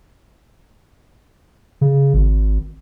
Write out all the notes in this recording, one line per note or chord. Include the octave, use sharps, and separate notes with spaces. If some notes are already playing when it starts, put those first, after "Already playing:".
C#3
G#1